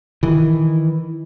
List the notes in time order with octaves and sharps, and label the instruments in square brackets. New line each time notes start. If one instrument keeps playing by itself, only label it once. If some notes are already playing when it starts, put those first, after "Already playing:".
[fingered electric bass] D#3 E3